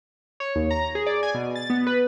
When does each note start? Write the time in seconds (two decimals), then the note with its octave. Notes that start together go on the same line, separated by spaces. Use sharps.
0.40 C#5
0.56 D#2
0.71 A#5
0.95 G#4
1.06 D5
1.23 G#5
1.34 B2
1.56 A6
1.70 B3
1.87 B4